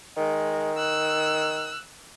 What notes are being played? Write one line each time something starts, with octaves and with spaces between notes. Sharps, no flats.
D#3 G#3
E6 F#6